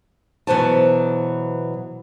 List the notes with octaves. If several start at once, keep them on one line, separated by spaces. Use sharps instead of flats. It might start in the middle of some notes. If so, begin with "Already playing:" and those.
B2 E3 F#3 C5 G#5 A5